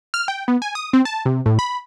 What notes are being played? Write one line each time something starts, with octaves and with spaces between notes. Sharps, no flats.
F6
G5
B3
G#5
D#6
C4
A5
C3
A2
B5